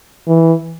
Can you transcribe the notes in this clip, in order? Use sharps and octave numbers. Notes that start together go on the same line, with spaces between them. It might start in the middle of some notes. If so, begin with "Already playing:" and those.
E3